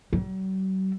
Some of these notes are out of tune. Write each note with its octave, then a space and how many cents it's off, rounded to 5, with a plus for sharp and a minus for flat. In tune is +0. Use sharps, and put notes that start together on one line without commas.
F#3 +45